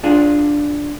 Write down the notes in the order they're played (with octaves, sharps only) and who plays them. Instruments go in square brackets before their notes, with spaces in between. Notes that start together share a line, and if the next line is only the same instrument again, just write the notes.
[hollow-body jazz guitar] D4 F4 G#4